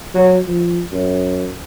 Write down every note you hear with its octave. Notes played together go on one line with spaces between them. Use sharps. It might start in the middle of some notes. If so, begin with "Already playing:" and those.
F#3
F3
F#2